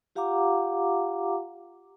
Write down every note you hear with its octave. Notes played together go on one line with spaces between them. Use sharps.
F4 G4 F5 F#5 A#5 D6